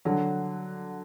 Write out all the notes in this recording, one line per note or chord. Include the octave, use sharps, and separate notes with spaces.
D3 F#3